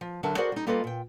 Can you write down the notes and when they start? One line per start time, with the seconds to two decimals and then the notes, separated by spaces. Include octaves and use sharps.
0.01 F3
0.23 D3 F#3 A#4 E5 A5
0.37 F#4 G#4 A#4 C5 D5 F#5
0.52 G3 D#4
0.67 G3 A#3 F4 A4 B4 D#5
0.84 A#2 G5